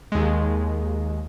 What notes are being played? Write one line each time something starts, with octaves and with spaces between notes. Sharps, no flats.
D#2 G#3